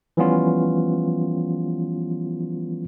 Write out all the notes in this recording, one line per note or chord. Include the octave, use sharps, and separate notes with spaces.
E3 F3 G3 B3 C#4 F4